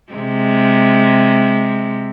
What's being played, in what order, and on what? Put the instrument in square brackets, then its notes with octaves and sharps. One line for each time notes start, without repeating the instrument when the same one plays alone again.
[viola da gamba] C3 G#3